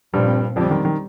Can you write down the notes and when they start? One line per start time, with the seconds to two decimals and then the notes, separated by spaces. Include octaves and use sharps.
0.14 G2 A#2 F3 G3 C4
0.56 F2 D3 F3 G3 C4
0.71 D#3
0.85 D#3